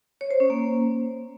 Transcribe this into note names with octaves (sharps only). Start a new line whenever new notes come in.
C#5
C5
C#4
A#3